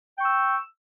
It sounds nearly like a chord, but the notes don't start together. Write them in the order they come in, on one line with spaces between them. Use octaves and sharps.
G5 C#6 E6